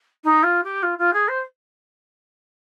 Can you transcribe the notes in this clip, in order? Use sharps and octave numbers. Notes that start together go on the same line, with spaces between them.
D#4
F4
G4
F4
F4
G#4
C5